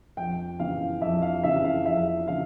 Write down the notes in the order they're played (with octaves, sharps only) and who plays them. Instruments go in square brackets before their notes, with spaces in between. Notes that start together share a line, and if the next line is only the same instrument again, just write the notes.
[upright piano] F2 G5
C#3 E3 F5
F2 E5
F5
C#3 E3 E5
F5
F2 E5
C#3 E3 F5